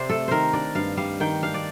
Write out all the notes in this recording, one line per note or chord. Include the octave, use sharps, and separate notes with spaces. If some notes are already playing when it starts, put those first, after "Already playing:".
Already playing: C3 C4 C5 D5
A3 A4
D#3 A#4 C5
D4 D5
G2 F5
G3 F5
D#3 G5
D4 F5
D5